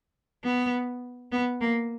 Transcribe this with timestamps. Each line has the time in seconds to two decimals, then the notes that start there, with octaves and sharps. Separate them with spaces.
0.45 B3
1.32 B3
1.61 A#3